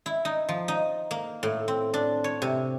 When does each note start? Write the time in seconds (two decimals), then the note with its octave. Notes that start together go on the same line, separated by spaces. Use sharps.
0.06 E4
0.25 D#4
0.49 F3
0.68 D#4
1.11 A#3
1.43 A2
1.68 C4
1.94 D4
2.24 C#5
2.42 C3